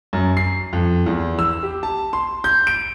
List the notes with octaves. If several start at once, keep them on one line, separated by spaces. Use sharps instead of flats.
F#2
C7
F2
E2
E6
G4
A5
C6
G6
D7